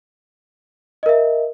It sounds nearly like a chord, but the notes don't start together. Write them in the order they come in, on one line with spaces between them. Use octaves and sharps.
D#5 A#4 E5